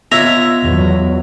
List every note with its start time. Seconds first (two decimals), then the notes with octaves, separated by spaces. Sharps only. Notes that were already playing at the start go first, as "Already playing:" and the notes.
0.12 B3 F4 C#5 D#5 E5 A#5
0.62 E2 F#3